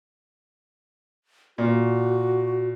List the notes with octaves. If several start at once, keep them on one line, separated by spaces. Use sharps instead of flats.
A#2 F#4